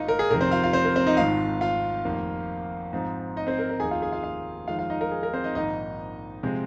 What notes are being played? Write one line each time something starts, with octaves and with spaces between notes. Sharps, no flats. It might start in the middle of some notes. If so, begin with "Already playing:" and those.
Already playing: G#1 G#2 D#3 A#3 D#4 F4 D#5
A#4
G#4
F2 C3 D#3 A#4
C4 C5
F4 F5
F4 F5
C4 C5
A#4
C4 C5
D#4 D#5
G#1 G#2 D#3 F4 F5
F4 F5
F1 F2 D#3 A#3
G#2 F3 C4 D#4
D#4 D#5
C4 C5
A#4
A#4
F1 D#2 D#3 A#3 D#4 G#4 G#5
F4 F5
G#4 G#5
F4 F5
F4 F5
F2 D#3 G#3 D#4 F4 F5
F4 F5
D#4 D#5
A#4
G#4
A#4
C4 C5
D#4 D#5
A#1 G#2 D#3 A#3 D#4 D#5
C3 F3 G#3 C4